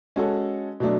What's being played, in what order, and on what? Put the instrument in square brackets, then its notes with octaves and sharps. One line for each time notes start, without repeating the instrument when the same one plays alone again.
[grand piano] G#3 C#4 F#4 A4 C#5
B2 F#3 A3 D4